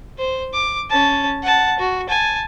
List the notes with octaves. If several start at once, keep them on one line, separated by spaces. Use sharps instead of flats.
C5
D6
C#4 A5
F#5 A5
F#4
G#5 A5